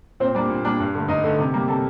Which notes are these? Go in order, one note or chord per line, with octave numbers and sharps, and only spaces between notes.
A#2 C4 C5
G3 A#3 D4 D5
A#2
G3 A#3 D4 D5
G2
D3 A3
G2 D#4 D#5
D3 A3
C3
G3 A#3
C3 A4 A5